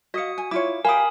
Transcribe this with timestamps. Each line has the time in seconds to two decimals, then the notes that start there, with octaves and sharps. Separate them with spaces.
0.14 F#4 D#5 F5 D#6 C#7
0.38 G#5
0.51 E4 F4 C#5 D6
0.85 G4 A#4 F5 G#5 B5 D#6